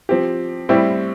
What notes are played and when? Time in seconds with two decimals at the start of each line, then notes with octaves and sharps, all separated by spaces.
0.09 F3 C4 G4
0.69 A2 G3 C4 E4 G4